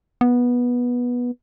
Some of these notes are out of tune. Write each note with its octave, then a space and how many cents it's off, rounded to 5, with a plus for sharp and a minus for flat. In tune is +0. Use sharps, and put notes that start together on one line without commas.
B3 -15